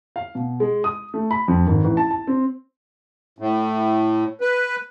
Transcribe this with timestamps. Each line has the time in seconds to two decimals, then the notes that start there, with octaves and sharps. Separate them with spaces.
0.16 F5
0.35 B2
0.60 G#3
0.84 D#6
1.14 A3
1.31 B5
1.48 F2
1.67 G#1
1.84 A1
1.97 A5
2.11 A5
2.27 C4
3.39 A2
4.41 B4